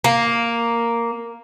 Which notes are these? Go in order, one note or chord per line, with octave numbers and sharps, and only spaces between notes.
A#3